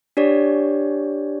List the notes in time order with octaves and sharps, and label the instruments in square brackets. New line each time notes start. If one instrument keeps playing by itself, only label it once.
[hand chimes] D4 G4 C#5 D5